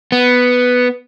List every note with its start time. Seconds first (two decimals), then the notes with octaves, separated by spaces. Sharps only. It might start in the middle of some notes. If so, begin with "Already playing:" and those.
0.12 B3